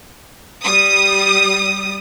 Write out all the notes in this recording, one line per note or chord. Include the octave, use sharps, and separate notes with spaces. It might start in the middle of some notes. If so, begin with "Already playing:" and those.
G3 D#6